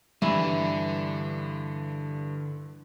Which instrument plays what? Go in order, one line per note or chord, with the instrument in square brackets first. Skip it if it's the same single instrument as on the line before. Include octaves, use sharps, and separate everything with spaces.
[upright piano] G2 [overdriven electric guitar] D3 [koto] E3